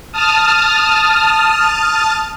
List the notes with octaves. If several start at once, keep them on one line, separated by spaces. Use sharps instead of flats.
A5 D#6 F6